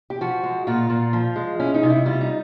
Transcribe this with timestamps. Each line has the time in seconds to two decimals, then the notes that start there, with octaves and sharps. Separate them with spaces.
0.10 G4
0.21 F3 F#4
0.43 G#3
0.67 A#2 F4
0.90 A#2
1.13 F3
1.36 G#3
1.60 C#4 E4
1.74 D#4
1.83 C3 F4
1.90 E4
2.06 G3 F4
2.21 D#4